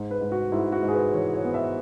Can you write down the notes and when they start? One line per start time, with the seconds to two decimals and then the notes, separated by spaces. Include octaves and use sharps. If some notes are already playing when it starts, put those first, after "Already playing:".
Already playing: G#2
0.11 B4
0.21 G#2
0.32 F#4
0.52 G#2 E4
0.72 F#4
0.83 G#2
0.88 G#4
0.93 B4
1.13 E3 C#5
1.33 C#5
1.44 B3
1.54 E5